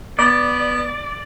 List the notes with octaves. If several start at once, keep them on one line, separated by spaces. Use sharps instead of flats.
B3 D5